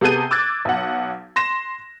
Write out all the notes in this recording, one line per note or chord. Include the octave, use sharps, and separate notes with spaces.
C3 B3 G#4 A4 G6 D#7
D6 E6 F#6 G#6 A6
B1 F#5
C6 A#6 E7